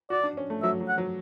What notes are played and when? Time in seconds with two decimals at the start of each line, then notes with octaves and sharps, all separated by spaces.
0.10 F#4 D5
0.24 D4
0.37 C#4
0.50 A3
0.63 F#3 E5
0.80 F#3
0.88 F#5
0.98 F#3